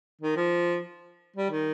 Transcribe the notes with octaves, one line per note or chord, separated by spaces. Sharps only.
D#3
F3
G3
D#3